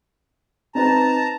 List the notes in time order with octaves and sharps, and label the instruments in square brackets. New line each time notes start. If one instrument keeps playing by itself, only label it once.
[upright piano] C4 D#4 B4 [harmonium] A5 A#5